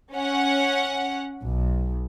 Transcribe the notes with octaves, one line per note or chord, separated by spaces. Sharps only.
C#4 F#5
B1